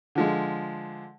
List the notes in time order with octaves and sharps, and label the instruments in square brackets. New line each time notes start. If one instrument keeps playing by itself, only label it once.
[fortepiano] D3 F3 G#3